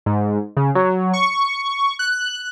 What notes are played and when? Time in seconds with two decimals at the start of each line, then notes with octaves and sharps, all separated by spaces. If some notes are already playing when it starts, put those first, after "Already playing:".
0.06 G#2
0.57 C#3
0.75 F#3
1.13 C#6
1.99 F#6